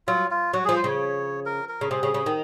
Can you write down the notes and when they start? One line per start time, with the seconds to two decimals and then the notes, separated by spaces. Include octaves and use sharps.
0.07 F#3 F4
0.31 F4
0.53 F#3 F#4
0.65 F3 G#4
0.76 C5
0.84 C#3 C#5
1.46 A#4
1.69 A#4
1.81 C#3
1.91 C3 G#4
2.03 C#3
2.14 C#3
2.26 D#3